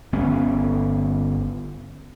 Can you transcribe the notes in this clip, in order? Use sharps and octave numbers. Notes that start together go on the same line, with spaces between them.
G1 B3 C#4